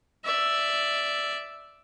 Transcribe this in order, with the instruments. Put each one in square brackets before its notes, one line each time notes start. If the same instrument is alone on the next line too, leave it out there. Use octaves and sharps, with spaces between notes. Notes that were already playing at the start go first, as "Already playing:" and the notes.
[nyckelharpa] D5 E5